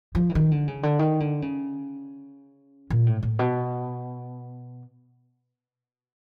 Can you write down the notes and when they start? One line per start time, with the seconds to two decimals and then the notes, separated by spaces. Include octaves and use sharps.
0.15 F3
0.29 E3
0.35 D#3
0.51 D3
0.68 C#3
0.83 D3
0.99 D#3
1.20 D3
1.42 C#3
2.90 A#2
3.06 A2
3.23 A2
3.39 B2